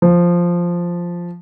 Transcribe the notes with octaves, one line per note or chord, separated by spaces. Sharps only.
F3